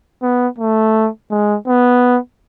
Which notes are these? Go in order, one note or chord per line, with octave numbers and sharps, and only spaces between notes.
B3
A3
G#3
B3